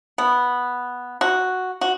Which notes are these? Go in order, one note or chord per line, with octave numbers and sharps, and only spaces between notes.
B3
F#4
F#4